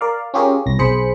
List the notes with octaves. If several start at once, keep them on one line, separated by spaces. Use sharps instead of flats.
A#4 D5 F5
C#4 F4 G4 G#4 A#4 C#5
C2 A#6
B1 G#4 C5 B5 C#7